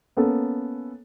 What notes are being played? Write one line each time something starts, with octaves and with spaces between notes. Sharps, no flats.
A#3 B3 C#4 A4